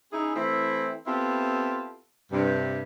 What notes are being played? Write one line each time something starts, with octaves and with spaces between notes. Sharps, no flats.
C#4 D#4 E4 G#4
E3 A3 C4 E4
B3 C4 E4 F4 G4 A4
G2 C3